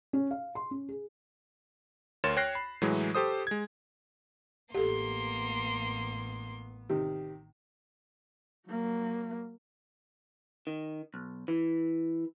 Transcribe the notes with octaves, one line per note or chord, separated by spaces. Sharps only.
C#4
F5
C6
C#4
G#4
D2 A#4 C#5 C6 A6 E7
C#5 G5 F6 F#6 A#6 C7
B5
A2 E3 F#3 G#3
G4 A4 C5 D#6
G#3 G#6
A1 A#3 B3 G4 A4 C6
C3 D#3
F#3 A#3
D#3
B1
E3